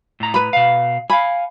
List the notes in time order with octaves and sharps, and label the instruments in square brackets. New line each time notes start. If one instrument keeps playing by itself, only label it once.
[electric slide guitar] A2 A#5
[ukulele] B4 B5
[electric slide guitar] B2 F5
[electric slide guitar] F5 G#5 [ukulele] B5